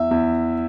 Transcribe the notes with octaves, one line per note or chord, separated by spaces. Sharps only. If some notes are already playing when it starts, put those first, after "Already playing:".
Already playing: E2 E5
E2